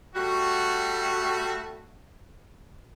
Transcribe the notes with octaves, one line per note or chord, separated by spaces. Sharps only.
G3 A3 F#4